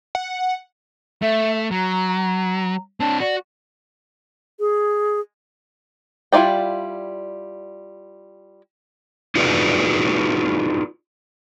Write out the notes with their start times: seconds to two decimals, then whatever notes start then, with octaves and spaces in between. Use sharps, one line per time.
0.15 F#5
1.22 A3 E5
1.71 F#3 A#5
3.00 C4 D4 A5
3.20 F#4 D5
4.60 G#4
6.32 G3 E4 F4 D5 G5
9.36 D#4 F4 F#4 G#4 B4 D5